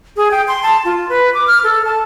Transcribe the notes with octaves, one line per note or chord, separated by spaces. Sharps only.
G#4
G5
C6
A5
F4
B4
D6
F6
A4
A5